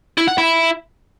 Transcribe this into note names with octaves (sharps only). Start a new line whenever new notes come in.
E4
F#5
E4